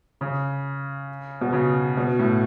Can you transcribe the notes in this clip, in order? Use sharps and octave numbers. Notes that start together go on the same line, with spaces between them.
C#3
B2
C#3
B2
A2